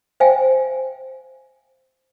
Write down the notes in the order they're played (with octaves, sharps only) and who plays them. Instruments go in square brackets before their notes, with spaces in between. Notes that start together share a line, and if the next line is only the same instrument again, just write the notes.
[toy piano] C5 E5 F5 G5 G#5